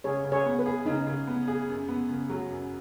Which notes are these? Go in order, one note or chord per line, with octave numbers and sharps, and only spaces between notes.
C#3 G#4 C#5
C#3
G#4 C#5
B3
B4
G#4
C#3 D#4
C#3
B3
G#4
F#2
B3
C#3
F#3
F#2